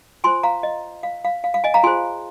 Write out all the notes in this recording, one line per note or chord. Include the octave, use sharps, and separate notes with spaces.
F4 C5 G#5 C6
F5 A#5
D#5
F5
F5
F5
F5
D#5 G#5
F5 A#5
F4 G#4 C5 G#5 C6